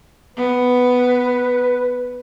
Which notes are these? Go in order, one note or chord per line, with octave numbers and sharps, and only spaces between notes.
B3 B4